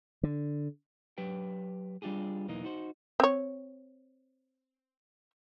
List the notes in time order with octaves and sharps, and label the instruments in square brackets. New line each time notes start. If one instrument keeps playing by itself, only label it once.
[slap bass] D3
[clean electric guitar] F#3 G4 B4 G5
G3 D4 F4 G4 G#4
B1 E2 E3 A#3 D#4 D#5
D#4 F#4 C5
[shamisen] C4 C#5